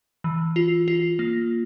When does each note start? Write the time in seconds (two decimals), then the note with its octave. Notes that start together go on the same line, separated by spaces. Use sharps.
0.24 E3
0.56 F4
0.88 F4
1.19 A#3